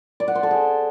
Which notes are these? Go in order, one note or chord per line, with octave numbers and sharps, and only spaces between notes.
D5
F#5
C5
A4
G#4